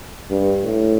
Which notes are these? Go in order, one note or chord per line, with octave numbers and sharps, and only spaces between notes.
G2
A2